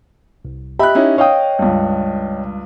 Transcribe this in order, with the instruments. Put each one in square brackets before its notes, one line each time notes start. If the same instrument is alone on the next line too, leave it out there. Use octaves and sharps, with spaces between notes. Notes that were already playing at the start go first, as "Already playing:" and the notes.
[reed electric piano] C2
[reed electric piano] G4 D#5 E5 [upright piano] B5 F#6
[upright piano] C#4 D#4 E4
[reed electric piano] C#5 D#5 G5 [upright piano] F5 D#6
[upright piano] C#2 G2